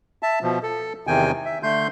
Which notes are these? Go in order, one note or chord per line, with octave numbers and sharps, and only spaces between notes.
E5 A5
B2 F3
A4
E2 C3 D#3 G5 G#5
E5
D3 A3 C6 G6